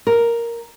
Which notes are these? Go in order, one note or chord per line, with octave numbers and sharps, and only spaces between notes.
A#4